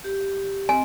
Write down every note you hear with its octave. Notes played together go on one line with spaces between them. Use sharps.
G4
C4 D#5 G#5